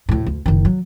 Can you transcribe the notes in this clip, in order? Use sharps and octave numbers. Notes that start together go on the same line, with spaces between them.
D2 A2
D2
F#1 D#3
F#3